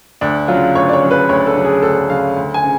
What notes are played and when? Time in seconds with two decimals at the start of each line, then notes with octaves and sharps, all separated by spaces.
0.21 D2 D4
0.48 C#3 F#3 F4
0.75 D2 C#5
0.89 D5
0.93 C#5
1.02 C#3 F#3
1.11 B4
1.29 D2 C#5
1.47 A4
1.55 C#3 F#3
1.64 G#4
1.82 D2 A4
2.09 C#3 F#3 F5
2.36 D2
2.54 G#5
2.63 C#3